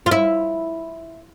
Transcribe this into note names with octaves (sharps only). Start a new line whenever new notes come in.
F4
E4